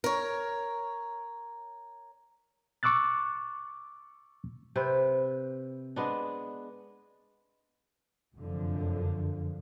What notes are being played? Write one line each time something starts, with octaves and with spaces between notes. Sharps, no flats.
A#4 C#5
C#6 D6 E6 F#6 A6
C3 B4 C5
G#3 B3 D4
F1 F#2 D3 F3